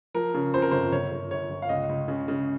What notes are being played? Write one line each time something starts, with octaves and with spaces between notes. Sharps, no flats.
F3 A#4
C#3
F2 C5
A#4
G1 C5
G1 C#5
G1
G1 C#5
G1
F5
C#2 D#5
C#2
C#3
C#3